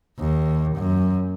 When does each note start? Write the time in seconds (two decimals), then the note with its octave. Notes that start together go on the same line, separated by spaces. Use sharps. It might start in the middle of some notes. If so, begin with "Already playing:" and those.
0.19 D#2
0.77 F#2